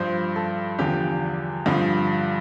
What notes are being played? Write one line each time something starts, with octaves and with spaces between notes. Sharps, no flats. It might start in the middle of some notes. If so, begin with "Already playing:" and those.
Already playing: G2 F3 C5
A4
E2 D3 F3 G4
G2 D3 F3